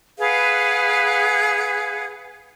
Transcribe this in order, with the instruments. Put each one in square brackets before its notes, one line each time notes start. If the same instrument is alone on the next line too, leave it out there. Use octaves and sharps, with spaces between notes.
[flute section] G#4 B4 F5 F#5